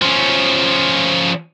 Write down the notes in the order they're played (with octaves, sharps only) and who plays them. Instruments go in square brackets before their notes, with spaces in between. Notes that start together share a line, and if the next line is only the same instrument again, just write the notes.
[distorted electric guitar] F3 C#4